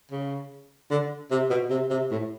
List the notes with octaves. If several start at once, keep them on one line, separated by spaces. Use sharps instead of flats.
C#3
D3
C3
B2
C3
C3
A2